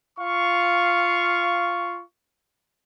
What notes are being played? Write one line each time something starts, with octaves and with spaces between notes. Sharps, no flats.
F4 F5 C#6